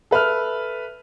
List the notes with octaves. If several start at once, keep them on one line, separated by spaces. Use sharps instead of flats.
A4 B4 E5 F6